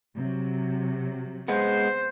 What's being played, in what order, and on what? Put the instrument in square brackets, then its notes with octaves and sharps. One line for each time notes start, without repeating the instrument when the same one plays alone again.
[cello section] C3 F#3
[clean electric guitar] G#3 B3 [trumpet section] C5